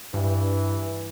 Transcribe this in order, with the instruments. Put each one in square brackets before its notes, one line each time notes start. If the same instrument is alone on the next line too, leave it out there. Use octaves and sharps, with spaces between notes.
[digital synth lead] G2 [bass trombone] E3